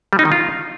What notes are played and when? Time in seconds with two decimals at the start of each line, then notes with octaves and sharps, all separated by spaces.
0.13 G3
0.19 D#4
0.25 D#3
0.32 F4